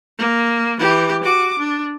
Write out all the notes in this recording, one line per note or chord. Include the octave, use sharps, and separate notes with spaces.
A#3
E3 G4
F#4 D6
D4